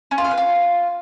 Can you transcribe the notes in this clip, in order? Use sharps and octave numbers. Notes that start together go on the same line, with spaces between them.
C#4
F4
F5
B4
F4